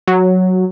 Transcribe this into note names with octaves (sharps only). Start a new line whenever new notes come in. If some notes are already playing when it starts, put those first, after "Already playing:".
F#3